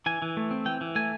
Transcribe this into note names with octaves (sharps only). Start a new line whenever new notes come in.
E3 G#5
E3
A3
C4
E3 G5
E3
A3 G#5